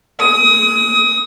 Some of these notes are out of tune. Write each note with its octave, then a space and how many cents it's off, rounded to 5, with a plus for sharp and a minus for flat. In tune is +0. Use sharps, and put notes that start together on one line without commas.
D#6 +30